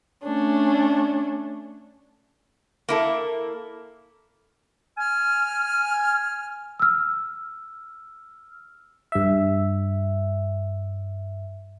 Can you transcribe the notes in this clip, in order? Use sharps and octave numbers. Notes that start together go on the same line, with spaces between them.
A3 C#4 D4
A#3 E4 A4
G#5 F6
E6 F6
G2 E5